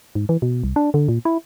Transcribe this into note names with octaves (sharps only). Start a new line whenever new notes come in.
G#2
E3
B2
C2
D4
D3
A#2
E4